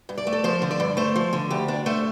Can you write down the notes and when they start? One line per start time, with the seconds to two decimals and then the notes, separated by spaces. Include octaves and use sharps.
0.09 G2
0.18 D5
0.27 A3
0.33 A4
0.44 F3 C5
0.62 D3
0.71 D5
0.80 G2
0.97 A3 C5
1.16 F3
1.33 D3
1.50 D2 G4
1.68 D4
1.86 A3 C5